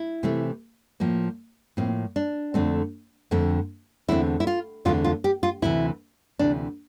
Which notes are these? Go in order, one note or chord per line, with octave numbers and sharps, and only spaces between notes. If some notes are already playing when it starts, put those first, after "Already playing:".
Already playing: E4
C3 E3 A3 C4
A2 F3 A#3
A2 F3 A#3 C4
D4
F2 D3 A3 C4
F2 D3 A3 C4
E2 D3 A3 C4 E4
E4
F4
E2 D3 A3 C4 F4
F4
G4
F4
D2 C3 E3 E4
D2 C3 E3 D4